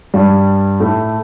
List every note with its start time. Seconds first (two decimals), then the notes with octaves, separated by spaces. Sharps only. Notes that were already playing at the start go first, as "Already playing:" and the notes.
0.14 G2 G3
0.80 A2 A3